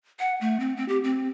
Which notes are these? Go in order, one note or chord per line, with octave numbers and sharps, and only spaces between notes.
F#5
A3
C4
C4
G4
C4